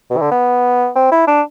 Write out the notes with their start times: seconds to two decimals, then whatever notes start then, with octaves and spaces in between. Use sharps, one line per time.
0.10 B2
0.17 E3
0.21 D3
0.31 B3
0.95 C4
1.11 E4
1.27 D4